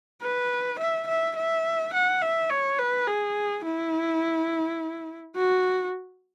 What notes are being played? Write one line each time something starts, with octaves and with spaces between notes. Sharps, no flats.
B4
E5
E5
E5
F#5
E5
C#5
B4
G#4
E4
F#4